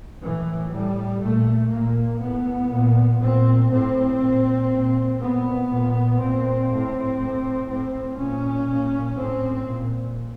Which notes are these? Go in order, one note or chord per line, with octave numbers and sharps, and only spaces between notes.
A2 E3
A2 G3
A#2 A3
A#2 A#3
A2 B3
A#2
A#2 C4
A2 C4
A#2
A#2
A#2 B3
A#2
A#2 C4
A2
A2
A2 C4
A#2 C#4
A#2
A2 C4
A#2